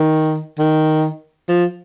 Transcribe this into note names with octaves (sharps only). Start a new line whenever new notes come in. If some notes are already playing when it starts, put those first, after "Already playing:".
Already playing: D#3
D#3
F3